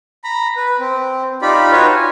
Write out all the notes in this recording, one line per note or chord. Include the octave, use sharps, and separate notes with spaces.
A#5 B5
B4
C4
D#4 F4 G4 D5 B5
D#4 F4 F#4 B4 C#5
G#5